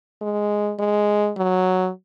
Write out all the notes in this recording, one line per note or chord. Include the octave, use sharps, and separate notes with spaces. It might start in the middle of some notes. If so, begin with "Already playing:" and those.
G#3
G#3
F#3